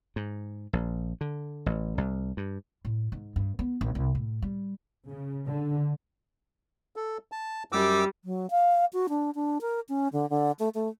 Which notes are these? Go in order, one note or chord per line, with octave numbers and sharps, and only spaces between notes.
G#2
A#1
D3
A1
C2
G2
A2
G#2
G2
B3
A#1
C2
A2
G3
C#3
D3
A4
A5
F#2 G3 D6 E6
F#3
F5
F#4
D4
D4
A#4
C#4
D3
D3
A3
A3